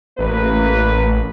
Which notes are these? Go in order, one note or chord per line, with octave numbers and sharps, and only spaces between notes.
A1 A#3 B4